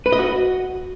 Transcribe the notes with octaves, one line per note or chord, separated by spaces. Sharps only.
B4
D#5
F#4